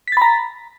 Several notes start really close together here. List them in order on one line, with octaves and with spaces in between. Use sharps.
B6 A6 B5 A#5